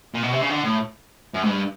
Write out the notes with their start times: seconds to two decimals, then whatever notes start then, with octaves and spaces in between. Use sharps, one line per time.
0.14 A#2
0.23 B2
0.32 C3
0.41 C#3
0.50 D3
0.64 A2
1.34 F#2
1.44 G#2
1.49 G2